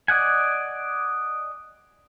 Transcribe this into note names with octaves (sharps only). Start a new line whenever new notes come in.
D5 D#5 F#5 G#5